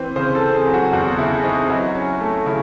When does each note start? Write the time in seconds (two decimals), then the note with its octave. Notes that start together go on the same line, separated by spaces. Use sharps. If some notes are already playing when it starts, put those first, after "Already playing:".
Already playing: E3 C4
0.16 C#3 C5
0.35 A4
0.42 C4
0.55 G#4
0.67 F#3
0.74 F#4
0.93 E2 F#4
1.18 C#3 E4
1.44 C4 D#4
1.69 F#3 E4
1.95 C#4
2.21 A3
2.46 C#3 E4